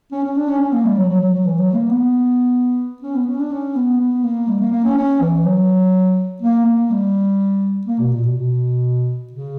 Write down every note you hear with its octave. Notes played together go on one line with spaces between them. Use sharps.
C#4
C#4
D4
C#4
C#4
A#3
G3
F#3
F#3
F#3
F#3
E3
F#3
A#3
B3
C#4
B3
C#4
D4
C#4
B3
B3
A#3
G3
A#3
A#3
C#4
C#4
E3
F#3
A#3
A#3
G3
A#3
B2
A#2
B2
B2
C#3